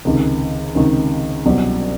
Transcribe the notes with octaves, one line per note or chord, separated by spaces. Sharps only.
C#2 C3 D#3
C#2 C3 D#3
C2 B2 F#3